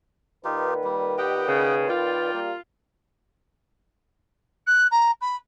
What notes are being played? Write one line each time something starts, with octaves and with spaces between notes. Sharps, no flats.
A#2 D#3 D#4 F4 G4 B4
G3
G4 D#5 F#5 G5
C#3
F4 D5 G5
G3 A#3
F#6
A#5
B5